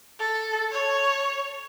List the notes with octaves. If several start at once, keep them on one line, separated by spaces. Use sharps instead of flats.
A4
C#5